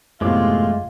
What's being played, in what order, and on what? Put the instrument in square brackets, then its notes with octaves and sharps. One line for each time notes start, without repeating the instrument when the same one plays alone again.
[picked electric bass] F#1 [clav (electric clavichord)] E2 A2 C3 [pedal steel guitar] G#3 A3 D6 [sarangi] F4